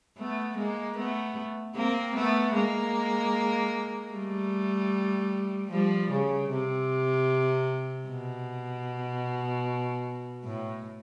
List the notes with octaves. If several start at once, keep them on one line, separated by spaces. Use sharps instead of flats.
A3 B3
G#3 A#3
A3 B3
A#3 C4
A3 B3
G#3 A#3
G3 A3
F3 G3
C#3
C3
B2
A2